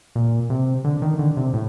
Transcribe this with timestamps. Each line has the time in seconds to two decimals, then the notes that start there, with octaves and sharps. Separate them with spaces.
0.16 A#2
0.50 C3
0.85 D3
1.02 D#3
1.19 D3
1.37 C3
1.54 A2